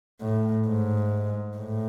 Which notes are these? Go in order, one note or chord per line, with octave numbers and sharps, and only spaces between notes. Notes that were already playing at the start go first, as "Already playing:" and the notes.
A2
G#2
A2